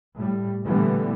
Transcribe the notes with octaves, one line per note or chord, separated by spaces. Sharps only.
A2 G3
A#2 D3 E3 G3 A3 B3